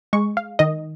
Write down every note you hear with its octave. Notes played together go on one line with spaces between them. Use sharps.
G#3 C#6
F5
D#3 D#5